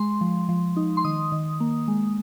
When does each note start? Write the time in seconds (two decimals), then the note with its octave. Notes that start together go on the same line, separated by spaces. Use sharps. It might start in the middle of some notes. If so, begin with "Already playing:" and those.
Already playing: G#3 C6
0.21 F3
0.49 F3
0.77 D#4
0.97 C6
1.04 D#3 D#6
1.32 D#3
1.60 A#3
1.88 G#3